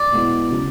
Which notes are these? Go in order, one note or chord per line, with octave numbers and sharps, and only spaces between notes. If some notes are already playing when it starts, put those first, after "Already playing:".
Already playing: D5
B2 G#3 B3 E4
C#3 F#3